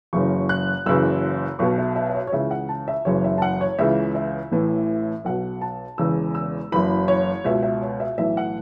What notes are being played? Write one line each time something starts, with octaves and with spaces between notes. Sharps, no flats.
F#1 F#2 C#3 E3 C#6
F#6
F#1 F#2 C#3 E3 E6
B1 B2 C#6
E5
E5
E5
C#5
C#5
C#2 C#3 E3 E5
F#5
A5
E5
F#1 F#2 C#3 E3 C#5
E5
A5
F#5
C#5
C#2 C#3 E3 E5
E5
A1 A2 E3
B1 B2 F#5
A5
E1 E2 C#3 E3 E6
E6
F#1 F#2 E3 B5
C#5
C#2 B2 E5
E5
C#5
E5
B1 A2 E3 E5
F#5